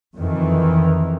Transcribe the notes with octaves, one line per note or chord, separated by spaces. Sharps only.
F2 D#3 E3